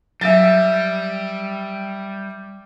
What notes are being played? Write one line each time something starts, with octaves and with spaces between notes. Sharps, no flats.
F#3 G3 E5 A6